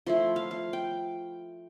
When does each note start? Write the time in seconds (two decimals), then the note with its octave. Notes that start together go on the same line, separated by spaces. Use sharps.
0.06 F3 A3 E4 C6
0.36 F5
0.51 F5
0.73 G5